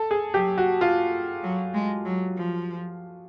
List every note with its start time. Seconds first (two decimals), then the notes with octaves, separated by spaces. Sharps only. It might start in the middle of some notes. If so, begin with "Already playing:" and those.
Already playing: A4
0.11 G#4
0.34 F#3 G4
0.58 F#4
0.81 F4
1.43 F#3
1.74 G#3
2.05 F#3
2.37 F3